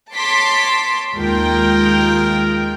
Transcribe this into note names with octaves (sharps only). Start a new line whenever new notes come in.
C#5 A5 C6 D6 B6 C7
D#2 G#3 F4 A#4 G5